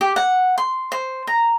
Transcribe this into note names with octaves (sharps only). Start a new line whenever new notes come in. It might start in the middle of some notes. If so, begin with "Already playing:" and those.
G4
F#5
C6
C5
A#5